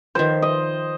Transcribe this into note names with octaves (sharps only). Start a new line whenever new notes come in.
D#3 F3 C5
D#5